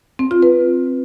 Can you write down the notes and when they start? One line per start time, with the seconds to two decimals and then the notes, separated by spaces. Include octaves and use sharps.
0.19 C4
0.31 F4
0.43 B4